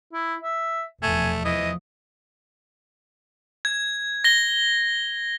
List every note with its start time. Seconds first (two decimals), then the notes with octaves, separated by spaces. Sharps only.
0.13 E4
0.42 E5
1.03 F1 E2 B2 A3 G#5
1.45 E3 F3 D#5
3.65 G#6
4.24 A#6 G7